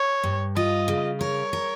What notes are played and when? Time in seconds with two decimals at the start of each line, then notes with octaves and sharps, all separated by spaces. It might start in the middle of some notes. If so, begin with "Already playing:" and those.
Already playing: C#5
0.23 G2
0.56 F4 D#5
0.88 C#3
1.21 A#4 C#5
1.53 A#4